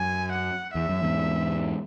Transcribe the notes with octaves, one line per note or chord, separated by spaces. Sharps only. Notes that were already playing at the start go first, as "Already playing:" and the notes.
Already playing: F#2 G#5
F#5
E2 E5
F#2
E2 G#2